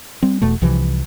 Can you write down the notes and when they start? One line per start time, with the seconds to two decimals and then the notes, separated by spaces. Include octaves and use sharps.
0.23 G3 C4
0.42 E1 E2 B2 A3
0.62 C2 C3 E3 F3